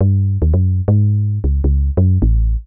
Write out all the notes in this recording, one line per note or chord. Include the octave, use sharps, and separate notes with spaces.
G2
D#2
F#2
G#2
C#2
C#2
F#2
A1